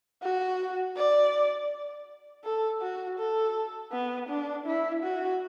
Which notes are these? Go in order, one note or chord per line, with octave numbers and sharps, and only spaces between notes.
F#4
D5
A4
F#4
A4
B3
D4
E4
F#4